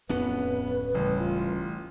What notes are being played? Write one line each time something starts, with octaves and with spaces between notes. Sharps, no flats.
D1 F2 B3 C#4 B4
A1 C#3 G3 A3
F4